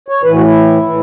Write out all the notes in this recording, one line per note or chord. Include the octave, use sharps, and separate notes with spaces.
C#5
A2 E3 B4
F#4
C#4
E4
A2 E3